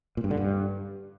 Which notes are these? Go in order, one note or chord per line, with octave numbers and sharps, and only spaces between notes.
A#2
G2
D3
G2